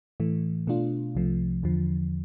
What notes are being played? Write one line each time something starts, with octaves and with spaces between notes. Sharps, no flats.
A2 E3 A3
B2 A3 D4 F4
C2 C3 F3 A3
E2 D3 F3